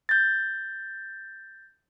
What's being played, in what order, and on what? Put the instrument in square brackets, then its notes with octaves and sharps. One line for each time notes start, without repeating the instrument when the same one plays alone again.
[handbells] G6 A6